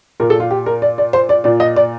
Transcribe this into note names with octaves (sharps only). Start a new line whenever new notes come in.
A#2 A#4
A4
F4
G4
A#4
D5
D5
C5
D5
A#2 D5
D#5
D5